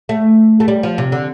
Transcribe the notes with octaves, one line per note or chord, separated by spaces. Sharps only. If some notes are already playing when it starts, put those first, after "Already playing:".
A3
A3
G3
F3
C3
D3